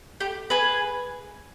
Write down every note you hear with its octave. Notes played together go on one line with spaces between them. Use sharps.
G4
G#4 B4